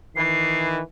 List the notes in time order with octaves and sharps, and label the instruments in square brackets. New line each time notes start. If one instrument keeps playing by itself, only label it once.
[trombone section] D#3 E3 [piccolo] C7